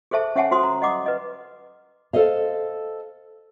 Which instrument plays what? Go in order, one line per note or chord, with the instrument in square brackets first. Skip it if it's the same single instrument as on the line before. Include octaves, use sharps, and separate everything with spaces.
[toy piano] G#4 A4 C5 E5 A5
C#4 C#5 E5 F#5 G#5 A5
F#4 C5 C6 D#6
A#5
D#5 F#5 D6 D#6
B4 D#5
[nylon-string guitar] A4 C5 D#5 F5